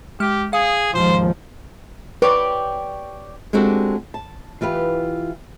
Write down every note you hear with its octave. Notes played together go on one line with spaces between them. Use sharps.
G#3 G4 F6
G#4 F5 D#6
D#2 G#2 F3 C5
G4 B4 C#5 D5
G#3 C4 D4 F#4 G4 A4
A5
E3 F4 G4 B4